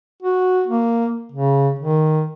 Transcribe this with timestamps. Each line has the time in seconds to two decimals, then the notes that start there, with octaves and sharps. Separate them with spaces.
0.23 F#4
0.67 A#3
1.32 C#3
1.79 D#3